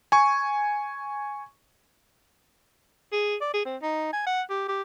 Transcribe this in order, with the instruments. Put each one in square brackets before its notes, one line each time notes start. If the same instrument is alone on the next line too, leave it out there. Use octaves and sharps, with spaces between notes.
[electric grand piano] G#5 C#6
[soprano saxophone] G#4
D5
G#4
C4
D#4
G#5
F#5
G4
G4